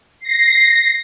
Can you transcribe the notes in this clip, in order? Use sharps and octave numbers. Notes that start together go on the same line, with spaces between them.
A#6 C7